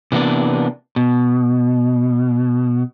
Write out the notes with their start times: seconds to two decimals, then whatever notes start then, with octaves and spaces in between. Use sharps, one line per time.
0.12 C3 E3 A#3 B3 D4
0.96 B2